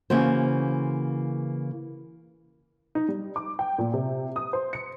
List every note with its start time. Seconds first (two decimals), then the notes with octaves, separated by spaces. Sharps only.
0.10 C#3 E3 A#3 F#4 C5
2.95 D#4
3.09 G3
3.36 D6
3.59 G5
3.78 A#2
3.93 C3
4.36 D#6
4.53 C5
4.73 C#7